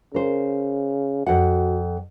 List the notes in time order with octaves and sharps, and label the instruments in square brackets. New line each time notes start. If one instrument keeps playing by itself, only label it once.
[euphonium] C#3 [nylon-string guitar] A#4 C5
[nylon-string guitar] F2 F#5 [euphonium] F#4